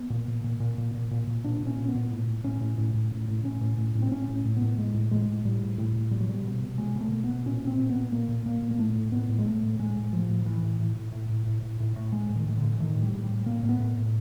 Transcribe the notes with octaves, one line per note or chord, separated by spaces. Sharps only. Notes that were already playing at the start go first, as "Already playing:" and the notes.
Already playing: B3
A#2
A#2
A#2
A#2
A#2
A#2
A#2
A#2
A#2 D4
A#2
C#4
A#2
B3
A#2
A2
A2
A2 C#4
A2
A2
A2
A2
A2
A2 C#4
A2
A2
A2
C4
A2 C#4
A2
A2
B3
A2
A2 G#3
A2
A2 G#3
A2
A2 G3
A2
A2
A2
B2 G3
F#3
B2 G3
B2
B2
B2 G#3
B2
A3
B2
B3
B2
A#2 C#4
A#2
C4
A#2
B3
A#2
A#2 A#3
A#2
A#2 A#3
A#2
A#3
A2 A3
A2
A2 B3
A2
G#3
A2 A3
A2
A2 G#3
A2
A2 F3
A2
D#3
A2 E3
A2
A2
A2
A2
A2
A2
A2
A2
A2
A2 G#3
A2
D#3
A2 D#3
A2 D3
E3
A2 D#3
A2
G3
A2
G3
A2
A2 A#3
A2
B3
A2
A2